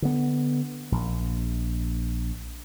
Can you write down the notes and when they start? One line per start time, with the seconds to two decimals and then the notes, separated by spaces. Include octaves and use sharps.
0.02 D3 B3
0.92 A#1